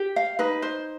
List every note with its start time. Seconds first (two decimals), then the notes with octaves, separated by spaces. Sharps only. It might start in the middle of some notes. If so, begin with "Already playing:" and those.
Already playing: G4
0.16 F5
0.39 D#4 B4
0.62 C5